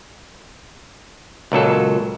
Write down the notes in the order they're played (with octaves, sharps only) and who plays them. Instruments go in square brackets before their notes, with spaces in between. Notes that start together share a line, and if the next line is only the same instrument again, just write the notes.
[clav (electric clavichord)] C#2 A#2 F#3 A4